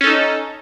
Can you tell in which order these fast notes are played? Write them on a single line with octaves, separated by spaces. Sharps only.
C#4 A4 D#4